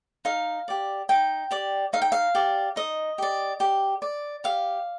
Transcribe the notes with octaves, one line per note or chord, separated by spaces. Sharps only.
D#4 F5
G4 D5
D#4 G5
G4 D5
D#4 F5
G5
F5
G4 D5
D#4 D#5
G4 D5
G4
D5
G4 F5